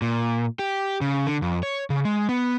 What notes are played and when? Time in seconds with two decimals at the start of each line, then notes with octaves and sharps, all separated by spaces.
0.02 A#2
0.59 G4
1.01 C#3
1.27 D3
1.42 F2
1.63 C#5
1.90 C#3
2.05 G#3
2.29 B3